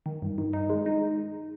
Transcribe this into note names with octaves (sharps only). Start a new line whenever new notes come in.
D#3
G2
D#3
D#4
G#3
D#4